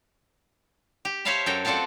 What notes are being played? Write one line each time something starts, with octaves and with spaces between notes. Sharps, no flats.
G4
C5 C#5 E5 F5 A5 B5
F#2 A4 G5 A#5
A3 C4 F4 A4 D5 F#5